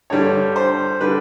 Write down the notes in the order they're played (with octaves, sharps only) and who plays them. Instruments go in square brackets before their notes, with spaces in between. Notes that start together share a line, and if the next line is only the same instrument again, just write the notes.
[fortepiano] G2 D3 G3 C#5
C5
D3 G3 B4